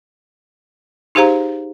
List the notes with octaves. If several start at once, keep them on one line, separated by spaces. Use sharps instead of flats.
D#4 G4 G#4 C5 F5 A#5